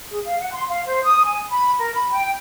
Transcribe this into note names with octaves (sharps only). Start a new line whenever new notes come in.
G#4
F5
F#5
C6
F5
C5
D#6
G#5
B5
A#4
B5
G5